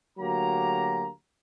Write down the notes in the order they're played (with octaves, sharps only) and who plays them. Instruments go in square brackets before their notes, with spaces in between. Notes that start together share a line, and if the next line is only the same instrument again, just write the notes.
[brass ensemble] D2 F#3 A#3 G4 A#5